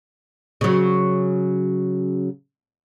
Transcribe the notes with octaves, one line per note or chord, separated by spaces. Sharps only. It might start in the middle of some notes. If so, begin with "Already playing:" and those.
C#3 F#3